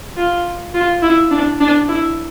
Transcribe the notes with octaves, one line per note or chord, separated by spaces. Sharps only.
F4
F4
E4
D4
D4
E4